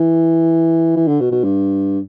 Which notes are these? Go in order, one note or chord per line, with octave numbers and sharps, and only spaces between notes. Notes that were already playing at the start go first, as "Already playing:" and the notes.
Already playing: E3
E3
D3
B2
B2
G2